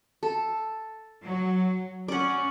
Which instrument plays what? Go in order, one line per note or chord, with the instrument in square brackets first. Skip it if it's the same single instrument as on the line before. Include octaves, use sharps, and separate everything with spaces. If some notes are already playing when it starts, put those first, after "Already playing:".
[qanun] A4
[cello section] F#3
[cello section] C#4 [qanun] D5 F#5